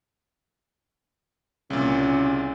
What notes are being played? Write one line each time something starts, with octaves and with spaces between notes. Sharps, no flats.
C2 A#2 C#3